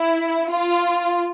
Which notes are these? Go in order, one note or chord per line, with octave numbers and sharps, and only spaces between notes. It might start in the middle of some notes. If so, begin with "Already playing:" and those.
Already playing: E4
F4